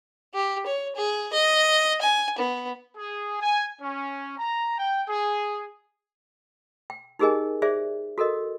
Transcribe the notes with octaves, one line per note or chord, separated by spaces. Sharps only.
G4
C#5
G#4
D#5
G#5
B3
G#4
G#5
C#4
A#5
G5
G#4
G5
D#4 G4 G#4 A#4 D#5 G#5
G#4 C5 D5 E5
F#4 A4 A#4 D#5